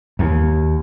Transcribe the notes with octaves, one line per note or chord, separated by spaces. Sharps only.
D#2